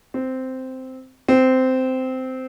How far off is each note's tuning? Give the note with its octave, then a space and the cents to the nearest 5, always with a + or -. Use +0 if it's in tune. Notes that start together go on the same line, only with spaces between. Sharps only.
C4 -10
C4 -15